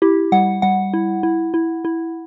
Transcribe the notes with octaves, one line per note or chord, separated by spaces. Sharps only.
E4 G4
G3 F#5
G3 F#5
E4
E4
E4
E4